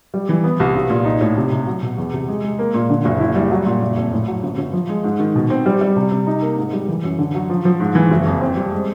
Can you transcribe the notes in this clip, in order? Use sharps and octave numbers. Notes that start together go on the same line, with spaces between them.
G3
E3
B3
C2
B1
A#2
D#4
A2
C3
C3
F#3
B2
E2
C3
G#3
G#3
A#3
A#2
D3
F#1
E4
G3
F#3
A#2
F#1
F2
A2
F#3
G1
G1
F3
G#3
G#2
D#3
B2
C4
G3
G3
C3
C3
D#4
A#3
G#2
G3
E3
F#2
D3
F#3
F3
F3
G#2
E3
F#1
F2
C4
G3
G#3